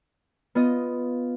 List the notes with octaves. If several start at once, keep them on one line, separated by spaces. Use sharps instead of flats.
B3 F4 D#5